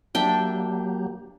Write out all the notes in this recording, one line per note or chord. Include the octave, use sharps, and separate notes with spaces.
F#3 A#3 D4 G4 E5 G5